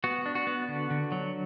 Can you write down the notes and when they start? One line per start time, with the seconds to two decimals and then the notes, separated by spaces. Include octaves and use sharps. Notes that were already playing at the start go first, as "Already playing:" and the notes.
0.04 B3 F#4
0.26 D4
0.35 F#4
0.47 B3
0.68 D3
0.90 D3
1.12 F#3